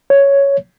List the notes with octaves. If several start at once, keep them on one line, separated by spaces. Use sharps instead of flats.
C#5